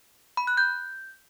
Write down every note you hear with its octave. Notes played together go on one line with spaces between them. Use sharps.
B5
F#6
G6